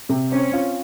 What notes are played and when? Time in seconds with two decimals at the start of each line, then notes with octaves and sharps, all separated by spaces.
0.09 C3
0.32 C4 C#4
0.53 F4